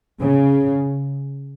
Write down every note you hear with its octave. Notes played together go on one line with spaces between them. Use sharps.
C#3